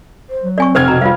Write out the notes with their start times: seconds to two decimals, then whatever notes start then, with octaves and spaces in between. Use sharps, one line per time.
0.29 C5
0.42 F#3
0.58 C4 D5 G#5 C#6
0.75 F1 C5 F6 G#6
0.88 B2 A#5
1.01 G3 F4 C5 F5